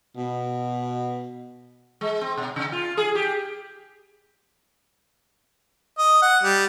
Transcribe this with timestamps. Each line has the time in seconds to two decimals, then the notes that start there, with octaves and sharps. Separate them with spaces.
0.16 B2
2.01 G#3
2.21 C4
2.37 B2
2.56 C3
2.72 F4
2.97 G#4
3.15 G4
5.98 D#5
6.22 F#5
6.43 G3